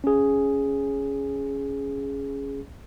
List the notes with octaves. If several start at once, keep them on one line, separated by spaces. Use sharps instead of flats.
C#4 G#4